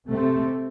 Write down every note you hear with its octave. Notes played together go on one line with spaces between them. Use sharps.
C3 A3 C4